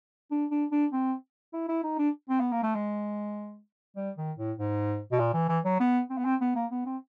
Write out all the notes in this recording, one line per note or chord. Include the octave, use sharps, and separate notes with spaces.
D4
D4
D4
C4
E4
E4
D#4
D4
C4
B3
A#3
A3
G#3
G3
D#3
A2
G#2
B2
A#2
E3
E3
F#3
B3
C4
B3
C4
B3
A#3
B3
C4